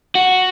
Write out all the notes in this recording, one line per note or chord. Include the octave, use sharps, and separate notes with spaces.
F#4